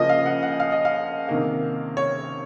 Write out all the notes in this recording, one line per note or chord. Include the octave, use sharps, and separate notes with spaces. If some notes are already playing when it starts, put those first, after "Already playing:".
Already playing: C#3 F3 A#3 D#5
F5
F#5
F#5
F5
D#5
F5
C3 D#3 A#3
C#5